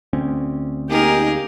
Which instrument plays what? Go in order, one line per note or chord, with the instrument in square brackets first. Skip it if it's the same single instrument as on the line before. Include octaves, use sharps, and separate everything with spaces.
[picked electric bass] D2 C4 C#4
[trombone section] A#3 D#4 [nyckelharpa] G4 [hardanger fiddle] G#4 A#4